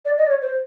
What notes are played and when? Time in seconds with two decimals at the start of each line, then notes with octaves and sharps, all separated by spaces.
0.05 D5
0.18 D#5
0.25 D5
0.29 C#5
0.42 C5